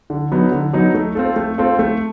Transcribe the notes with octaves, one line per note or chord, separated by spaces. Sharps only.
D3
F#3 B3 D#4
D3
F#3 B3 D#4
A3
C4 F4 A4
A3
C4 F4 A4
A3